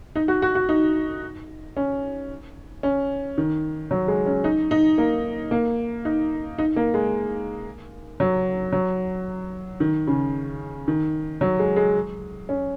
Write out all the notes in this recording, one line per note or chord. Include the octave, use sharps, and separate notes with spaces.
D#4
F#4
F#4
F#4
D#4
C#4
C#4
D#3
F#3
G#3
C#4
D#4
D#4
A#3
A#3
D#4
D#4
A#3
G#3
F#3
F#3
D#3
C#3
D#3
F#3
G#3
G#3
C#4